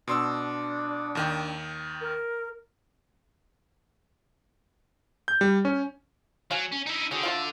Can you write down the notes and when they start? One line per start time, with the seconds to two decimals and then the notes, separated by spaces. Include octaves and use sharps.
0.08 B2 D4 C6 E6
1.15 D#2 D#3 G5
2.01 A#4
5.28 G6
5.41 G3
5.65 C#4
6.51 F#3 F5 G#5
6.72 C#4
6.86 D#4 E4
7.11 D3 F#4 G#4 G5
7.23 A3 F4 F5